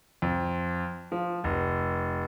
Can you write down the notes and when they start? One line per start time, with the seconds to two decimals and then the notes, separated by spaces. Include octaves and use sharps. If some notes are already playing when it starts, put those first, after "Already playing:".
0.22 F2
1.12 F3
1.44 F1